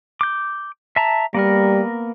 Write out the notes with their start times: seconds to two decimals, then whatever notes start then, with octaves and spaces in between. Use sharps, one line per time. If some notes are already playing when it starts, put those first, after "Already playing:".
0.21 D6 G6
0.96 E5 A5 A#5
1.34 G3 A#3 B3 A#4